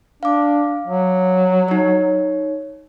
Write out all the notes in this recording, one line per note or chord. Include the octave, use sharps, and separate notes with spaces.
D4 F5 D6
F#3
D#4 C#5